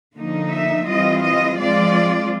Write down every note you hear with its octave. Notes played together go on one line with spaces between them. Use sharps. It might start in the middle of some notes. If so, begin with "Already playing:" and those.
D3 F3 A#3 D#4
E5
E3 G3 C4 F4 D#5
D#5
F3 G#3 C4 F4 D5